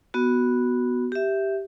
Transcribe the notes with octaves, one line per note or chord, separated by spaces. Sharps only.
B3 F#4
G4 E5